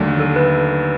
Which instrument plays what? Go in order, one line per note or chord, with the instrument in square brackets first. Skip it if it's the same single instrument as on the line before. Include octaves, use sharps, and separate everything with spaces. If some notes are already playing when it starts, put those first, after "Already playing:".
Already playing: [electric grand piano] D#2 D3 F#3 A3 D4
[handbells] A4
B4